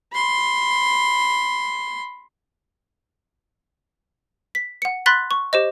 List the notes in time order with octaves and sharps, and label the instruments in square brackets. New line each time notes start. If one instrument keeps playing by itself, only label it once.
[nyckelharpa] B5 C6
[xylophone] B6
F#5 C#7
B5 C6 F#6 A6 B6
C#6
G4 C5 D#5